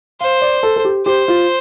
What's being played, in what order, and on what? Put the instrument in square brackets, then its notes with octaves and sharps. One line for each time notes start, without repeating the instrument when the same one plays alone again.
[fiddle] C5 [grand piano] F5
[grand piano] D5
A4
A4
G4
[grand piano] G4 [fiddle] C5
[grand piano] F4